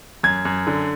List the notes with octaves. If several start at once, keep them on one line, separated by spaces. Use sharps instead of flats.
F#2 G#6
F#2
D3